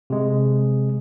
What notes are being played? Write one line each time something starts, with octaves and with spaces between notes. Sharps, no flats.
C3 G#3